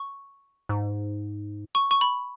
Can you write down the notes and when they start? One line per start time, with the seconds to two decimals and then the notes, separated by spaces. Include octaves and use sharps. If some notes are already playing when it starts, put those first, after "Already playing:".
Already playing: C#6
0.69 G#2
1.75 C#6
1.91 C#6
2.01 B5